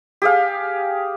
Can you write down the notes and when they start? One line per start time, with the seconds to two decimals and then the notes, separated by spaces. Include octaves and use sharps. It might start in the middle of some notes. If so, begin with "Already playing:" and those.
0.22 G4 G#4 F5